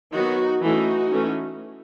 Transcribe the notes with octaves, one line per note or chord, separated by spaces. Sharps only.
D#3 F#3 B3 D#4 F#4
E3 A3 C#4 D#4 F#4
E3 A3 C#4